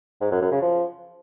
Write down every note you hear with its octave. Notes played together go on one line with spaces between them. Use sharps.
G#2
F#2
F#2
C#3
F3